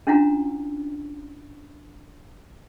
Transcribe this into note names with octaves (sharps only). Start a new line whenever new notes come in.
C#4 D4 E4 F4 F#5 A#5